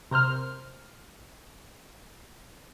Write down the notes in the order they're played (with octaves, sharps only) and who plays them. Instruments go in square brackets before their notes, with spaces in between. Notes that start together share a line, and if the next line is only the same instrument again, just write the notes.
[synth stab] C3 A#4 C5 F6